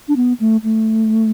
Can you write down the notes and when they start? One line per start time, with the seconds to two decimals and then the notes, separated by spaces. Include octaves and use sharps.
0.08 D4
0.16 B3
0.40 A3
0.64 A3